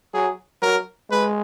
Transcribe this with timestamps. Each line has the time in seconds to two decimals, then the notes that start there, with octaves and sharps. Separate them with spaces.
0.14 F#3 G#4
0.62 F#3 A#4
1.10 G#3 B4